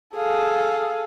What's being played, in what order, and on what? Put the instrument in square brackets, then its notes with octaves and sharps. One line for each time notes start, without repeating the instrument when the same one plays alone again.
[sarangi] G#4 [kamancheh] A4 F5